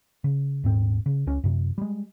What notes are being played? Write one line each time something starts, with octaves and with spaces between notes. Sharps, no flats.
C#3
D#1 G#2 C4
C#3
C#2 C#4
F#2 C3
G3 G#3